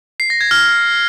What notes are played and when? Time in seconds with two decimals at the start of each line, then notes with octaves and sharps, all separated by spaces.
0.20 C7
0.30 A#6
0.41 G#6
0.51 F6